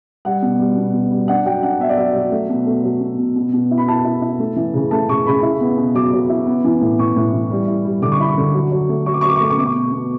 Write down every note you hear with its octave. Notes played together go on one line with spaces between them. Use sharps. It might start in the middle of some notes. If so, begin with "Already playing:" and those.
G3 F#5
B2
G3
B2
B2
G3
D4 F#5
F#3 G5
D4 F#5
B3 E5
D5
F#3 E5
F#3
A3
B2
A3
F#3
B2
B2
B2
B2
E4
B5
E4 A5
E4
E4
A3
E3
C#3
A3 A5
C#3 C#6
C#3 B5
E4
B3
B2
F#3 D6
F#3
E4
B3
E3
A2
A2 C#6
A2
E3
G3
E4
G3
D3 D6
C#6
E4 B5
C#6
D3
F#3
F#3
A3
F#3 C#6
D6
C#6
F#3
D6
C#6
A3 D6
C#6
B2 D6
C#6
B2
B2